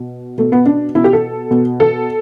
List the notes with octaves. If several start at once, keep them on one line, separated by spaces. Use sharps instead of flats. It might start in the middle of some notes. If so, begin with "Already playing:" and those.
Already playing: B2
B2 A3
B3
D4
B2 E4
G4
A4
B2
A4